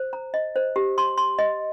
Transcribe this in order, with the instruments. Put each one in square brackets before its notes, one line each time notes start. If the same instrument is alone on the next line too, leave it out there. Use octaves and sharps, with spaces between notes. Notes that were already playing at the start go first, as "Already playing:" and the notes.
Already playing: [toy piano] C5
A#5
D#5
C5
G4
C6
C6
D#5